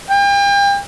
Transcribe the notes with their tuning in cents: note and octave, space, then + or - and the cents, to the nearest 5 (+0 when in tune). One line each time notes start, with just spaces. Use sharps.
G5 +40